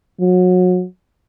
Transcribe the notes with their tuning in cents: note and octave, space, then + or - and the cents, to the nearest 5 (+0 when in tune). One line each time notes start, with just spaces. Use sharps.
F#3 -30